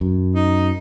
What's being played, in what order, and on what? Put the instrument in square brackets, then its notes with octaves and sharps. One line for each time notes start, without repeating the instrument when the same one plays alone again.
[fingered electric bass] F#2
[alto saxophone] D#4